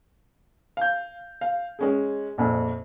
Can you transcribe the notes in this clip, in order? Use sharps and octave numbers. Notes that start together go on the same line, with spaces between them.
F5 G6
F5
G#3 C#4 G#4
A#1 F2